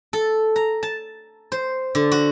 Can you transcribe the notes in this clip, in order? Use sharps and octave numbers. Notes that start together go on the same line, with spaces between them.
A4
A#5
A5
C5
D3
F#4